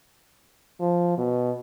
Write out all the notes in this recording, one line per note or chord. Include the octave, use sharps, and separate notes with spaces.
F3
B2